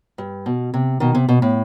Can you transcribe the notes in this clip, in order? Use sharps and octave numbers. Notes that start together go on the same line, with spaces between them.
G2
B2
C3
B2 D#3
C3
B2
A2